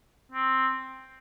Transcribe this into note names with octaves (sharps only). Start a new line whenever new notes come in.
C4